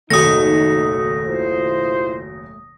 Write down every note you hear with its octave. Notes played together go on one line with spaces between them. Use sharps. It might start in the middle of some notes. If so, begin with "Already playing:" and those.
F#1 D#2 B2 A3 D#4 D#6 A#6
E4 F4 C5